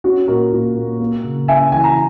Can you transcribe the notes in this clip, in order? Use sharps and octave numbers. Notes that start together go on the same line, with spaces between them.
C#4 F#4
A#2 F#4 A#4
A#2
A#3
A#3
C#3
C#4 E5 G#5
E3 G#5
A#5